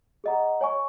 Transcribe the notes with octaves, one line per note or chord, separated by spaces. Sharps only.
G#4 D#5 F#5 A#5
C#5 G#5 C#6